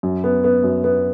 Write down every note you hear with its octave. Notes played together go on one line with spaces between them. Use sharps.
F#2
B3
B3
F#2
B3